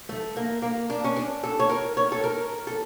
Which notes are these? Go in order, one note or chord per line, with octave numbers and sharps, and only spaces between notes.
A3
A#3
A#3
D4
C#4
D4
A4
C#5
A#4
C#5
A4
A#4
A4